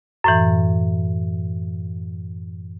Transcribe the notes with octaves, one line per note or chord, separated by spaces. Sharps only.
F#2 A2 E3